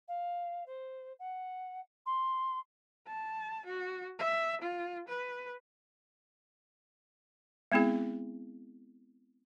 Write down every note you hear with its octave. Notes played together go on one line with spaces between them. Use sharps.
F5
C5
F#5
C6
A5
F#4
E5
F4
B4
G#3 B3 C4 E4 G#4